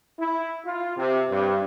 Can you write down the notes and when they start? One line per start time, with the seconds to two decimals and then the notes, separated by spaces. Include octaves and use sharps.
0.19 E4
0.66 F4
0.96 C3
1.30 G2